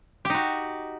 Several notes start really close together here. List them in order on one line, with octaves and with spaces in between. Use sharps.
G4 D#4 F#4